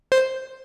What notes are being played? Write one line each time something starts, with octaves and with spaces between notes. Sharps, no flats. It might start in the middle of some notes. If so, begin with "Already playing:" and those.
C5